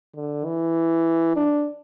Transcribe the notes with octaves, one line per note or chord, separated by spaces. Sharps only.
D3
E3
D4